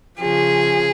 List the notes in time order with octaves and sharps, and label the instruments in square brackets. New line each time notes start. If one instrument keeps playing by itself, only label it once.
[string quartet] C#3 F3 G#4